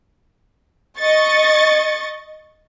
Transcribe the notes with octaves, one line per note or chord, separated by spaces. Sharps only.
D#5 C#6 A6